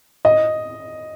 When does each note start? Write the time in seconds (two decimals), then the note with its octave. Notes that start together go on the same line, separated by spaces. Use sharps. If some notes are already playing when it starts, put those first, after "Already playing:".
0.25 D#5